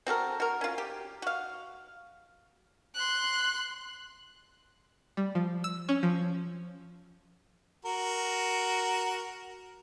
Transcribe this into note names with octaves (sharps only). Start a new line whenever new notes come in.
C4 F#4 A4 A#4
F#4 A#4
C#4 F4
G4
F#4 F5
C6 F#6
G3
F3
E6
C#4
F3
F#4 A#4